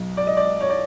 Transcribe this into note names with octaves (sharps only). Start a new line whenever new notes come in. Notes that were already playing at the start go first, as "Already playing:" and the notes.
Already playing: B1 F#3
D5
D#5
D5
C#5
D5